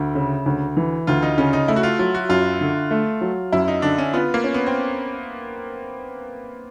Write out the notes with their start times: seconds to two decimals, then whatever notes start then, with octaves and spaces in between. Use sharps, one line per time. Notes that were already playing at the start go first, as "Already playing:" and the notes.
Already playing: D2 E4
0.15 C#3
0.46 D2
0.77 E3
1.07 D2 F4
1.23 D#4
1.38 C#3 C#4
1.53 D#4
1.68 A3 E4
1.76 F#4
1.83 F4
1.99 F#3 F4
2.15 F#4
2.29 F#2 F4
2.61 D3
2.91 A3
3.21 F#3
3.52 F#2 E4
3.68 D#4
3.82 D3 D4
3.98 C#4
4.13 B3 F4
4.34 A#3
4.44 C#4
4.54 B3
4.66 C4